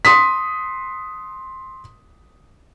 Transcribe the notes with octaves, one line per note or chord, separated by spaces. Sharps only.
C6 D#6 B6